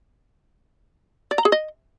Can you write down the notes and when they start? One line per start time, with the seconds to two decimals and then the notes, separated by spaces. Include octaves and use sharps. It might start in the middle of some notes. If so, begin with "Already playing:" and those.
1.31 D5
1.38 A#5
1.45 G#4
1.52 D#5